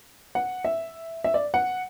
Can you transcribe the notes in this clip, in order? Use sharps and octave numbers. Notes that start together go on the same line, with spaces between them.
F#5
E5
E5
D5
F#5